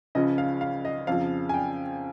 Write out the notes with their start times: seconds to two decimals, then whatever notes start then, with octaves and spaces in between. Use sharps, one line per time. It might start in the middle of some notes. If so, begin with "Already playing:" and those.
0.15 C#2 C#3 F3 D#5
0.38 F5
0.61 F5
0.85 D#5
1.07 F2 C#3 F3 F5
1.49 G#5
1.54 G5